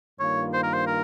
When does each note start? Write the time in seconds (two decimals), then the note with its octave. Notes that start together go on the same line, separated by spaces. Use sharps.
0.20 G2 D#3 A#3 F4 C#5
0.53 C5
0.63 A#4
0.73 C5
0.87 A#4